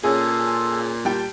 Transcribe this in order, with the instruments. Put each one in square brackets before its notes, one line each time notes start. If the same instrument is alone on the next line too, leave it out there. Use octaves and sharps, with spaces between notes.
[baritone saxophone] A#2 [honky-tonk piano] C#4 G#4 [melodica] F4 A4
[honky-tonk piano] G3 G5 [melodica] A5